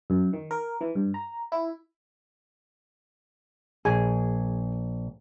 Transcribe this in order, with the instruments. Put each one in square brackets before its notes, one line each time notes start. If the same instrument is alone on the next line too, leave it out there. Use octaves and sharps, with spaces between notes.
[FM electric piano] F#2
D#3
A#4
E3
G2
A#5
E4
[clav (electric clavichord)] A#1 [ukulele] G#4